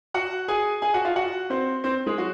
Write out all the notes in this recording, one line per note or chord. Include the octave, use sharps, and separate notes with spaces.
F#4 F#5
G#4 G#5
G#4 G#5
F#4 F#5
F4 F5
F#4 F#5
C4 C5
C4 C5
G#3 G#4
F#3 F#4